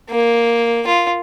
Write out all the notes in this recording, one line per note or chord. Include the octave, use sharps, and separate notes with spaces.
A#3
F4